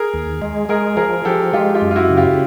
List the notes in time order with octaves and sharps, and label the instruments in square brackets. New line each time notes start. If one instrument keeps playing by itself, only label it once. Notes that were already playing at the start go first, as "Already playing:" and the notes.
Already playing: [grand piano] G#4 A#4
[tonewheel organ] D#2
G#3
[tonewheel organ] G#3 [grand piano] G#4 A#4
[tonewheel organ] F3 [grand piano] G#4 A#4
[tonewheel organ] F3 [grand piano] G4 A4
[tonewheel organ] G#3 [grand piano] F4 G4
[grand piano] F4 G4
[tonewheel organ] F#2
[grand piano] F4
E4 F#4
[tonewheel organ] C#3
[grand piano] F4 G4